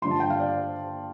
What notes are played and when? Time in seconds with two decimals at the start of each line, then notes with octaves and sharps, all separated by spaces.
0.02 G2 D3 F3 C6
0.11 A5
0.20 G5
0.30 F5
0.40 D5